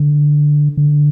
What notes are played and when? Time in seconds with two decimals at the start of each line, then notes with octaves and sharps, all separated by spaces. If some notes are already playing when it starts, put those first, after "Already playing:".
Already playing: D3
0.77 D3